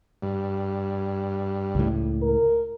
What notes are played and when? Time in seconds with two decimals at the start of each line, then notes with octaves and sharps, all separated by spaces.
0.22 G2
1.75 C#2 A2
2.22 A#4